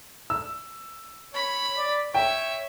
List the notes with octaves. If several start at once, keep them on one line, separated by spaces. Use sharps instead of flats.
E6
C#5 B5
D5
C#5 E5 G5